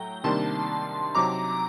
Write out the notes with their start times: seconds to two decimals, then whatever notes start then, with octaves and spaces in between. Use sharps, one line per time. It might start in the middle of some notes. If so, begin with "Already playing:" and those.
Already playing: A2 F#3 A3 G5 A#5
0.24 C3 D#3 G3 A#3 D4 A5 C6
1.15 C3 F#3 C4 D#4 A#5 D6